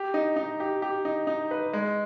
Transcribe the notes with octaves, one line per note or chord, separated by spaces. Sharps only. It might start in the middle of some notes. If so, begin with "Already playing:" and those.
Already playing: G4
D#4
D#4
G4
G4
D#4
D#4
B4
G#3